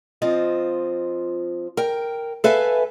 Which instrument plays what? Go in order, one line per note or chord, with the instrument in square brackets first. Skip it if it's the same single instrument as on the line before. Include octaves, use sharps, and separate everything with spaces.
[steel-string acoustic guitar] F3 C4 F4 D#5
A#4 G5
A4 B4 E5 F5 G#5